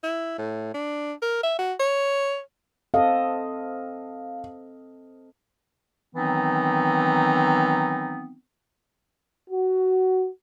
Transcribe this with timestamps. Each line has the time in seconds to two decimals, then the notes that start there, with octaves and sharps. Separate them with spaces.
0.03 E4
0.38 A2
0.74 D4
1.22 A#4
1.43 E5
1.59 F#4
1.80 C#5
2.94 C4 A4 D#5 F5
6.16 D#3 E3 F#3 B3 C4 D#4
9.50 F#4